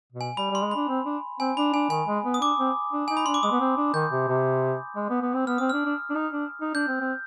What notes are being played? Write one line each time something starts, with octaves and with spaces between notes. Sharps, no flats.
B2
G#5
G3 B5
G3
C6
G#3
D4 B5
C4
D4
C4 G#5
D4 B5
D4 G#5
D#3 G#5
G#3
B3
D#6
D4 D6
C4
D4
D#4 G#5
B5
D4 C6
D6
G#3 D#6
B3
C4
D4
D#3 G6
C3
C3
G#3
B3
B3
C4
B3 F6
C4 D#6
D4 F6
D4
D4
D#4
D4
D#4
D4 G6
C4
C4